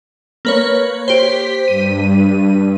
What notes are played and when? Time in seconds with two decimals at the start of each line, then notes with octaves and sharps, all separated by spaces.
0.45 A#3 B4 C#5
1.08 G4 C5 B6
1.68 G2 D#7